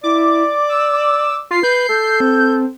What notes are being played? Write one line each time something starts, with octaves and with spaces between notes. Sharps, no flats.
E4 D5 D6
E6
F4 C7
B4 G6
A4
C4